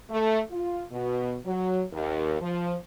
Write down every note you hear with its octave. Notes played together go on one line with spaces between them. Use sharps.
A3
F4
B2
F#3
D#2
F3